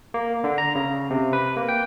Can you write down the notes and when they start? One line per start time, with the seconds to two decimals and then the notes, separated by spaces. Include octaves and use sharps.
0.14 A#3
0.44 D3
0.58 A#5
0.75 C#3
1.10 C3
1.33 B4
1.57 A#3
1.69 G5